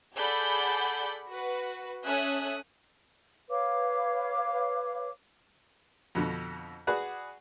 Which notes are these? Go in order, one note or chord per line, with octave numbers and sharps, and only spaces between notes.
G#4 A4 D5 F#5 B5 G6
F#4 B4
C#4 A4 E5 G#5 D#6 F#6
B4 C#5 F5 D6
F2 B2 D3
F#4 G#4 B4 D5 F#5